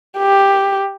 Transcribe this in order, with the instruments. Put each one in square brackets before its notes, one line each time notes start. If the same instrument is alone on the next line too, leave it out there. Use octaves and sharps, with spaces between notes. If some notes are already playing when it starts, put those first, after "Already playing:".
[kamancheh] G4